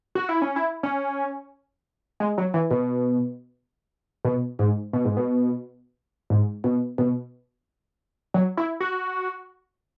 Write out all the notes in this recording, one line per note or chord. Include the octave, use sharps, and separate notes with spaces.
F#4
E4
C#4
E4
C#4
G#3
F#3
E3
B2
B2
G#2
B2
G#2
B2
G#2
B2
B2
F#3
E4
F#4